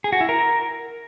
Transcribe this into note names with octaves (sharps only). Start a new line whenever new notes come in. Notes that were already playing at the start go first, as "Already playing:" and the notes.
G#4
F#4
E4
A#4